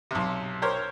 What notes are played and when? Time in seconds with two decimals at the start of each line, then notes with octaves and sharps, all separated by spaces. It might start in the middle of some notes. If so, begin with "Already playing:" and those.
0.11 B1 C3
0.62 G4 A#4 C5 C#5